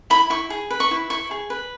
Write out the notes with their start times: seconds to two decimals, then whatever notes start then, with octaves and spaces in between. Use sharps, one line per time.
0.10 E4 B5
0.30 E4 C#6
0.50 G#4
0.70 B4
0.80 C#6
0.91 E4
1.10 E4 C#6
1.31 G#4
1.50 B4